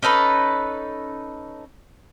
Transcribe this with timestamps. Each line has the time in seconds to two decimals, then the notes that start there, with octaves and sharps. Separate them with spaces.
0.02 C#4 D#4 A4 B4